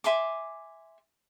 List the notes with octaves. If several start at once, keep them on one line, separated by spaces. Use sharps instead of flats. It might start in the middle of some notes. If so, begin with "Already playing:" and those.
E5 G#5 C6 D6